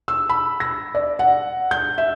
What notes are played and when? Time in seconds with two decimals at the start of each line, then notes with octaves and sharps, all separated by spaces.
0.08 E6
0.29 B5
0.60 A#6
0.95 D5
1.19 F#5
1.71 G6
1.98 E5